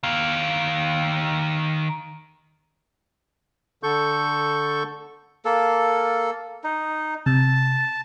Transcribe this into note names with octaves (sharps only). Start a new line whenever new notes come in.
D#3 F5
D3 A4 C#6 G6
A#3 A4
D#4
C3 A5